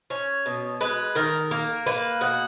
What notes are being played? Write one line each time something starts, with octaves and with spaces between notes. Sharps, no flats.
C#4 C#5
B2
G#3 B4
D#3 A#4
A#3 A#4
A#3 B4
B2 F#5